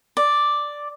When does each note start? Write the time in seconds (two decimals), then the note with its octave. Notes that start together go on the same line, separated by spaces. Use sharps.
0.17 D5